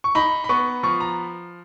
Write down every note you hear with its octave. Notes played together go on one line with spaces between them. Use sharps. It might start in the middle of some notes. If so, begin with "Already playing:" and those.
C#6
D#4 B5
B5
B3 C#6
F3 C#6
A#5